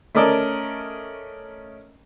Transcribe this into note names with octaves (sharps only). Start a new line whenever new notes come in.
A3 C#4 A#4 D5 D#5 A5